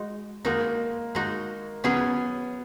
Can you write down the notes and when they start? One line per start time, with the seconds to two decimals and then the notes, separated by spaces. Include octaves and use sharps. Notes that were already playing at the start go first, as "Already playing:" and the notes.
Already playing: G#3 D#4 F#4
0.45 G#3 A#3 D#4 F#4
1.15 G#3 D#4 F#4
1.84 F#3 B3 C#4 G#4